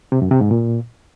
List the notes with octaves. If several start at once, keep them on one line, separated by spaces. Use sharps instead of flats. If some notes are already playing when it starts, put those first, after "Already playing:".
C3
F#2
C3
G#2
A#2